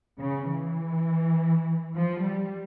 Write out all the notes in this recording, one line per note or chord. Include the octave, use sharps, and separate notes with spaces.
C#3
E3
F3
G3